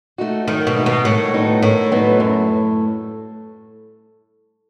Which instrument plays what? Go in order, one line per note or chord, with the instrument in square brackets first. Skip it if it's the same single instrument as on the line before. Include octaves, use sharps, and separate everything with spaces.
[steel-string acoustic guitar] A3 D#4 F#4
[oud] D#3 [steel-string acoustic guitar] F#3
[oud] B2
[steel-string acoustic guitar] A3 D#4 F#4
[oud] B2
[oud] A2 [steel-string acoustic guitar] D#3
[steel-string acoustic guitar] F#3 B3 D#4 F#4
[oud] A2 [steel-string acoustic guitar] D#3
[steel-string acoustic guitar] F#3 B3 D#4 F#4
F#2